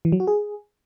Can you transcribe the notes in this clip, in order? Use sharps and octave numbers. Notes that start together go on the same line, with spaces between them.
E3
F#3
F#4
G#4